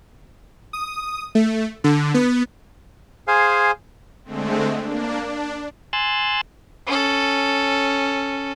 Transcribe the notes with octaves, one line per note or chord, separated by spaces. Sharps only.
D#6
A3
D3
B3
G#4 C5 F5 G#5
D3 G#3 A3 C4
A#3 D4
D4
G#5 C6 E6 F#6 A6
C#4 A4